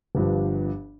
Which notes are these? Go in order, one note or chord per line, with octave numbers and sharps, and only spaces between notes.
G1 G2 F3